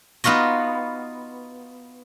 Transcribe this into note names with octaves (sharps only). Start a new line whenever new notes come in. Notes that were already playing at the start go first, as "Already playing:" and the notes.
B3 D#4 F4 F#4 D#5